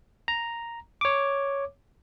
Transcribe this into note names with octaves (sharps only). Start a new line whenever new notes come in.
A#5
C#5 D6